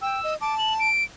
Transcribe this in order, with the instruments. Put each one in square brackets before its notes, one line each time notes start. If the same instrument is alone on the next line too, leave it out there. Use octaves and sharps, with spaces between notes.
[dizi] G5 [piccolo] E6
[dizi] D#5
[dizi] A5 [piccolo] D6
[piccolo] F#7
D7